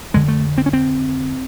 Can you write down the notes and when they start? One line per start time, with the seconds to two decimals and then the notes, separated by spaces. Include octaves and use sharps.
0.14 F2 D3 G#3
0.28 A3
0.58 C4
0.66 C#4
0.73 C4